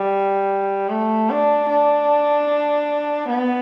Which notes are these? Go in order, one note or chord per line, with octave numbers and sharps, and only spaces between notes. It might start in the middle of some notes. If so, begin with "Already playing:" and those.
Already playing: G3
A3
D4
D4
B3